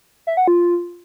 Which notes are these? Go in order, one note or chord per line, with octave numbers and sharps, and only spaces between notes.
E5
F#5
F4